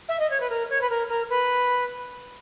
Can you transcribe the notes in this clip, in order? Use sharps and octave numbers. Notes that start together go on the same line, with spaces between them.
E5
D#5
C#5
B4
A#4
C#5
B4
A#4
A#4
B4